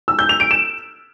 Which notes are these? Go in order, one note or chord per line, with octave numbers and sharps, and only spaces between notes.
E6
G6
F7
D7
E7